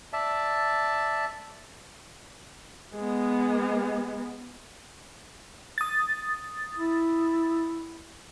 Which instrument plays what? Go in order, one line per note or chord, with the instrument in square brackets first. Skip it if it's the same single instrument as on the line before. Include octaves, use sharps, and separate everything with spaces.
[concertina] D5 E5 A5
[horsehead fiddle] G#3 B3
[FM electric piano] D#6 A6
[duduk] E4